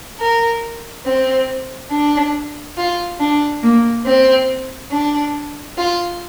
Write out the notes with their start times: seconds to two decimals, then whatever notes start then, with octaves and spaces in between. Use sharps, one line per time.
0.19 A#4
1.05 C4
1.91 D4
2.76 F4
3.19 D4
3.62 A#3
4.05 C4
4.90 D4
5.76 F4